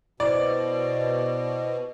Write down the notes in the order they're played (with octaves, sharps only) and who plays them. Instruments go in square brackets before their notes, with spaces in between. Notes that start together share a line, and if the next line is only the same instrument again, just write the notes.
[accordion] B2 [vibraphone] E4 B4 C5 [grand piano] D5